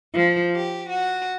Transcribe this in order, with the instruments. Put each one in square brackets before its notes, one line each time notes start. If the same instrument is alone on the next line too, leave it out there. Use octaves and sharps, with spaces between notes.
[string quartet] F3
G4
F#4